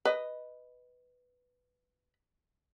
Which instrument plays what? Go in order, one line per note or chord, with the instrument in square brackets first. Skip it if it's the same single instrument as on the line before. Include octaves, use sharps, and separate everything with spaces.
[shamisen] B4 D#5